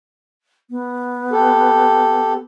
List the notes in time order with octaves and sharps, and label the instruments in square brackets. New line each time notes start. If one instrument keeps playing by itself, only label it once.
[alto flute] B3
[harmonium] G4 A4